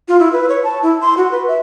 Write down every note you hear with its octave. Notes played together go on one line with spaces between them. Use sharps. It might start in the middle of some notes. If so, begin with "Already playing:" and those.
F4
E4
B4
C#5
A5
E4
C6
F#4
B4
E5